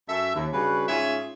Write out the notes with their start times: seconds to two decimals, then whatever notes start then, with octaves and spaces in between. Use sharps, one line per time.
0.09 F#2 A4 E5
0.35 D#2
0.53 G2 C#3 G3 F#4 B4
0.88 G#2 C#4 F4 G#4 E5